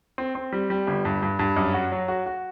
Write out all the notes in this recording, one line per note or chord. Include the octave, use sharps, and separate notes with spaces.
C4
C4
G3
G3
G1
G2
G2
G2
F#2
F#4
F#3
F#4
F#4